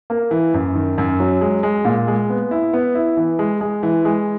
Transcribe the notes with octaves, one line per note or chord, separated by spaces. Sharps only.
A#3
E3
F#2
D#3
F#2
F#3
G#3
G#3
A#2
G#3
B3
E4
B3
E4
E3
G#3
G#3
E3
G#3